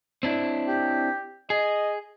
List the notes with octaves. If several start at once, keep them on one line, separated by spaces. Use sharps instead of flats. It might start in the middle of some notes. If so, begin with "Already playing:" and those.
C4 D4 E4
G4
G#4 D#5